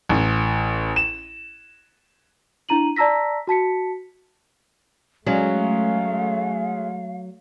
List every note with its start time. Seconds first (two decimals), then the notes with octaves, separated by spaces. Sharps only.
0.09 A1
0.96 E7
2.69 D4 E4 A#5 D#7 F#7
2.96 D5 A5 A#5 E6 A#6 B6
3.47 F#4 A5 B6 C#7
5.27 F#3 G#3 A3 C#4 F5